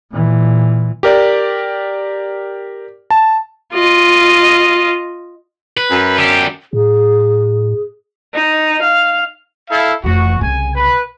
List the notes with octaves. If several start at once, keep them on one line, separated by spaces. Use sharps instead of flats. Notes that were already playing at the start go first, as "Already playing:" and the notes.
A#2 E3
G4 A#4 D5
A5
F4 D#5
B4
F#2
D3 G4
A2 G#4
D#4
F5
E4 A4 F5
F1 E3 F#4
C2 C#3 G#5
B4